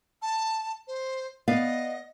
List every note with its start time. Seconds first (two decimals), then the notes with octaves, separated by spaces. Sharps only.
0.22 A5
0.87 C5
1.48 B3 D5 D#5 F5